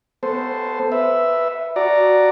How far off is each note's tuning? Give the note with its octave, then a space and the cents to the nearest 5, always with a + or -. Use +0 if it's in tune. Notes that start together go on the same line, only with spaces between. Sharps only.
B3 +25 A4 +0 C5 +0
B4 +0 E5 +0
F#4 +0 D5 +0 A#5 +0